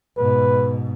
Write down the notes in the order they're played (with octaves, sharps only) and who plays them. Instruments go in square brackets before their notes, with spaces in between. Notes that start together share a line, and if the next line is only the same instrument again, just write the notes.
[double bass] G#2 B2 [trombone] B4